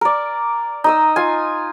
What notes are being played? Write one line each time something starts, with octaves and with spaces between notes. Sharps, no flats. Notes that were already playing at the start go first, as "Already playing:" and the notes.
A#4 D5
D#4 D#5 E6
F4 G#5